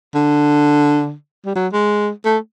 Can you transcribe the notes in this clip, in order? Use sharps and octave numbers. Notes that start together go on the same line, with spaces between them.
D3
G3
F#3
G#3
A3